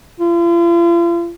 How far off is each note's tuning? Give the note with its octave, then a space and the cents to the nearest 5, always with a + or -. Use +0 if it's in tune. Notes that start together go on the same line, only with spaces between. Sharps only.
F4 -45